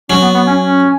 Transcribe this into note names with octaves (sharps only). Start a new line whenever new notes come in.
F#3 C#4
B3
B3
C#4
C#4